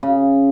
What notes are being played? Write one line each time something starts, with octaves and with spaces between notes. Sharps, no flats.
C#3